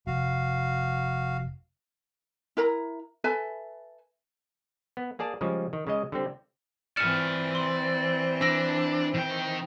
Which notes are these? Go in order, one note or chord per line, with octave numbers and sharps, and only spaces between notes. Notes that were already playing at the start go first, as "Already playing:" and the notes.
F1 F#4 F5
E4 A#4 A#5
A4 B4 E5 G#5
B3
A#3 G#4 D5 A5
C#3 F3 G3 G#3
D#3
C#3 G#3 D#5
D3 G3 C4
E3 C4 D5 G#5 F6 C#7 E7
C6
D4 E6 A#6
D#3 G5